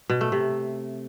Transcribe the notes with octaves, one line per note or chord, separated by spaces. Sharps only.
B2
A3
C3